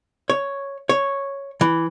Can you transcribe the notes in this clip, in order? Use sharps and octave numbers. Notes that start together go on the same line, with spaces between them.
C#5
C#5
E3